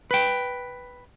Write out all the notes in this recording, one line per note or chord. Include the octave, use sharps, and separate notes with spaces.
B4 G5